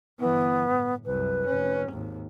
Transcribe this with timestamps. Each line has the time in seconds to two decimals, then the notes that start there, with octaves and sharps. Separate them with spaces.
0.19 G1 E3 B3
0.69 A2
1.05 C2 F#2 B4
1.46 F1 C#4
1.90 G#1 D#2